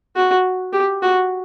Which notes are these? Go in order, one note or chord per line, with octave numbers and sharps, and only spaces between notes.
F#4
G4
F#4